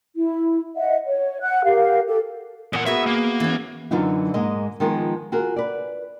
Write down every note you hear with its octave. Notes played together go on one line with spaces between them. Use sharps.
E4
D#5 E5 F#5
C#5
F#5 F#6
G4 A#4 F5
G4 A4
E2 A#2 F#5
B3 F#4 G#4 E5
A#3
E3 C#4
F#2 D3 E3 F#3 D#4 F4
G#2 G#3 A#3 D#5
D#3 F3 G#3 B3 F4 A#4
F4 F#4 G#4 A#4
B4 D5